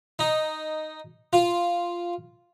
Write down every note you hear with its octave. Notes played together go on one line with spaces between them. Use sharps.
D#4
F4